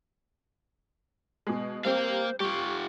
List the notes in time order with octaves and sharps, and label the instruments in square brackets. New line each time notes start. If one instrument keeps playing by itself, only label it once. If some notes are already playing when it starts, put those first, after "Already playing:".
[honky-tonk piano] B2 G#3
[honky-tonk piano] G3 C4 [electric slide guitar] A#3 F5 [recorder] C5
[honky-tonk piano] G3 [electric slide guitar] F4 G4 [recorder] C#6